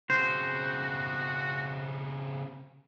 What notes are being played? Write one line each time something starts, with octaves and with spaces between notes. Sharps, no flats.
C#3 C4 F#4 C5